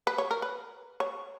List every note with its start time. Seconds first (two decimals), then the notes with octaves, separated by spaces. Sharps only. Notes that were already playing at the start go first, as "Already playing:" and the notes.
0.07 B4
0.18 C#5
0.31 A#4
0.42 B4
1.00 C#5